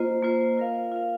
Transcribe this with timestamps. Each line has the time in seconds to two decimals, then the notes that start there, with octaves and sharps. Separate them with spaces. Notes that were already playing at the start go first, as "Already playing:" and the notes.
Already playing: A#3 F4 C5 D#5
0.23 A#3 F4 C5 D#5
0.57 F4 A#4 F5
0.92 F4 A#4 F5